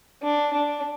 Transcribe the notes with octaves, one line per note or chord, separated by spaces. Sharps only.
D4
D4